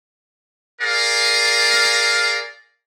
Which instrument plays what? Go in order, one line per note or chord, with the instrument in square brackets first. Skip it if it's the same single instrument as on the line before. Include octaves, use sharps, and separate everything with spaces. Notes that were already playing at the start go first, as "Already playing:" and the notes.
[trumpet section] G#4 A#4 D5 F5